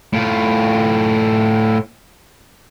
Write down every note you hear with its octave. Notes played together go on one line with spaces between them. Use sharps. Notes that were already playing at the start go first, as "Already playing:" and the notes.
A2 F4